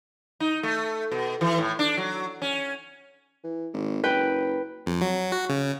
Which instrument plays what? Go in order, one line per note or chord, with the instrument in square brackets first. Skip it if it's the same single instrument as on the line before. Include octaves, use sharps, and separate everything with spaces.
[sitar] D#4
A3
B2
E3
A2
D4
F#3
C#4
[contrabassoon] E3
G#1
[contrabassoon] F#1 [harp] B4 G5
[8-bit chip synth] F2
F#3
F#4
C#3